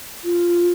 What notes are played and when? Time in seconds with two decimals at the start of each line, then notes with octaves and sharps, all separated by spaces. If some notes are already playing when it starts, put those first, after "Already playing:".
0.24 F4